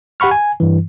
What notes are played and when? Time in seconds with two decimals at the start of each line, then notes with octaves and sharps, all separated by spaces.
0.20 G4 F#5 B5 C#6 F6
0.31 G#5
0.60 G2 E3